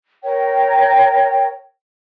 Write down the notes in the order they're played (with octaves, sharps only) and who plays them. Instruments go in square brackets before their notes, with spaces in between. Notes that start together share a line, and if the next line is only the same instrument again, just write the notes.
[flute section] A#4 C#5 G5